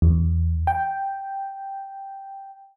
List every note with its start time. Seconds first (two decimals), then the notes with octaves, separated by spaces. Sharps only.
0.02 E2
0.67 G5